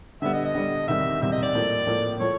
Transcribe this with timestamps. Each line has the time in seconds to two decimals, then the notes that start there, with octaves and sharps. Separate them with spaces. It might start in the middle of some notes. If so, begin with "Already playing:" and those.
0.22 D3 G3 B3 E5
0.33 D#5
0.45 D#5
0.55 D3 G3 B3
0.88 E2 C3 D#3 G3 E5
1.21 E2 C3 D#3 G3 E5
1.32 D#5
1.43 D5
1.55 A2 F3 A#3
1.87 A2 F3 A#3
2.20 A2 F3 C#5